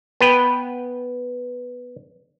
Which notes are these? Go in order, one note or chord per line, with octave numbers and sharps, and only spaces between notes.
B3 B4 G5